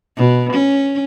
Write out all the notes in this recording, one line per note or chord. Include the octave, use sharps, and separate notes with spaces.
B2
C#4